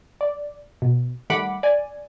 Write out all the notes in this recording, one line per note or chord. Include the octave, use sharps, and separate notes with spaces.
D5
B2
D#3 G3 A3 F#5 B5 D6
D5 G#5